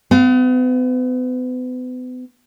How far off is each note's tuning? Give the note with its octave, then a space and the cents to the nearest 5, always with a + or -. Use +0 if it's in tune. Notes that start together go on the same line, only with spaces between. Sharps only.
B3 +40 F5 +0